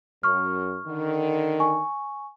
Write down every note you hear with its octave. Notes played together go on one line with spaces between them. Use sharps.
F#2 C#6 F6
D3 D#3
G#5 C#6